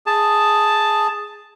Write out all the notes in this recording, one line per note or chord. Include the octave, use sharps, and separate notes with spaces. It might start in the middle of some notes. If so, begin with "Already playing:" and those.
G#4 A5